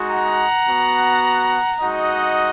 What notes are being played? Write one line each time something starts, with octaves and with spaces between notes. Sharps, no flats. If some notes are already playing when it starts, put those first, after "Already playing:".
Already playing: G#3 D#4 F#4
F#5 A#5
B3 F#4
G#3 D#4 F#4 D#5 F#5